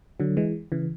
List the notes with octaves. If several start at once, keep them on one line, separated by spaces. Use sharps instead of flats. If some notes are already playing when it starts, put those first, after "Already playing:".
D3 F#3
E3 G#3
C#3 E3